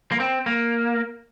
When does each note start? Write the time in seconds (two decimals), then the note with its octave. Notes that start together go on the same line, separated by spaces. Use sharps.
0.12 A#3
0.20 C4
0.46 A#3